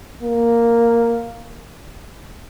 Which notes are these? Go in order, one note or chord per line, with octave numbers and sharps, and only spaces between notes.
A#3